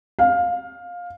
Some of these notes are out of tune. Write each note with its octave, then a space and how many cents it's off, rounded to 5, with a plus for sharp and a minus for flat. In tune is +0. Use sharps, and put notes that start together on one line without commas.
F5 +15